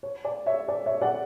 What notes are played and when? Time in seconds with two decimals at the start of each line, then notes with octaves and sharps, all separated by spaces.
0.03 C#5
0.25 D5
0.46 C#5 E5
0.68 D5
0.86 C#5 E5
1.01 D5 F#5